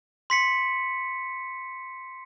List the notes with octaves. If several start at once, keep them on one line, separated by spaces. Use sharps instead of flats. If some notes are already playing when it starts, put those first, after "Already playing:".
C6 B6 C#7